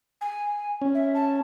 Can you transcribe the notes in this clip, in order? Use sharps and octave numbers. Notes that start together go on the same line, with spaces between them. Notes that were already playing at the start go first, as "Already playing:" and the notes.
G#5
C#4
E5
A5